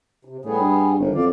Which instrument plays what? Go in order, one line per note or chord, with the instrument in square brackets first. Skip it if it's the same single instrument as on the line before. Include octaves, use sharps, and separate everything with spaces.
[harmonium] C3
[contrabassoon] A2 [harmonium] G3 B3 G#4
[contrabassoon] G2
[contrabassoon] G1 [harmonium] D#3
[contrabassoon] F2 [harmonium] F#3 D5 F5